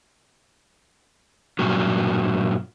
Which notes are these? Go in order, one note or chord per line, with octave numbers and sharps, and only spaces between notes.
G2 A#2 F#3